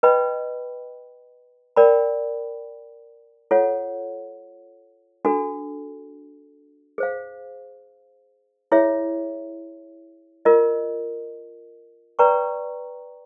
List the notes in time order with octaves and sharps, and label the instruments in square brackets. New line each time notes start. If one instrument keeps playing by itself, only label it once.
[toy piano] B4 D#5 G5 B5
A#4 D5 G5 B5
F4 A4 C#5 F#5
D4 F#4 A4
G#4 C5 F5
E4 G#4 C#5 E5
F4 A#4 D#5
B4 D5 G5 A#5 C#6